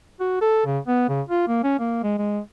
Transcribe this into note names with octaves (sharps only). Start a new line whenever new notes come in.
F#4
A4
C#3
B3
C#3
F4
A#3
C#4
A#3
G#3
G#3